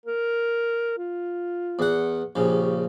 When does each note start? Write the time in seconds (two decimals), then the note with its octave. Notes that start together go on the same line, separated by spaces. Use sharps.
0.06 A#4
0.98 F4
1.79 E2 F#5
2.36 A#1 C#3 G4